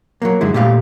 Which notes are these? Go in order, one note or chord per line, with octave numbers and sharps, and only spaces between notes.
F#3 A3 A#3
F#2 D3 G#3 E4
A#2 A3 G4 F5